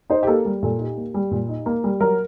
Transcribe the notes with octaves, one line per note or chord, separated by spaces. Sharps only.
D#4 C5
G4
A#3 A4
G3
A#2 A4
D#4 G4
A#3
G3
A#2
D#4
A#3
G3
F#3 A#4